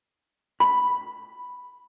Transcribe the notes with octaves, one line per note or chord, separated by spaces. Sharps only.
B5